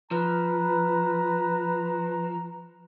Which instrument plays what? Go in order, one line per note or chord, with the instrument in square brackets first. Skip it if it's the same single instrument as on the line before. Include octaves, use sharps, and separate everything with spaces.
[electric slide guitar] F3 [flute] B4 [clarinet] A#5